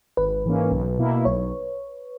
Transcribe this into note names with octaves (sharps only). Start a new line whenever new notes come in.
G#1 B4
G#2 E3 A#3 C#4
B1
B2 A#3 E4
B1 C#5